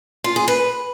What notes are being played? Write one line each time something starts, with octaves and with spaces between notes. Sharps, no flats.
F4
G#4
B4